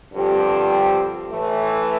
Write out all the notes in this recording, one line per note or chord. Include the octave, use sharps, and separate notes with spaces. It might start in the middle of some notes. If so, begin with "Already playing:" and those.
G2 D3 F3 C4 G4
A2 E3 A3